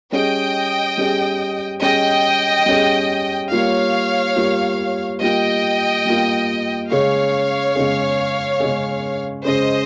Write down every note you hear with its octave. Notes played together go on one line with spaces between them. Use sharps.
G3 C#4 G#4 D#5 G5
G3 C#4 G#4
G3 C#4 G#4 D#5 G5
G3 C#4 G#4
G3 A#3 F4 C#5 F5
G3 A#3 F4
G3 A#3 F4 D#5 G5
G3 A#3 F4
C#3 G#3 C#4 G#4 C#5 F5
C#3 G#3 C#4 G#4
C#3 G#3 C#4 G#4
C#3 G#3 C#4 G#4 C5 D#5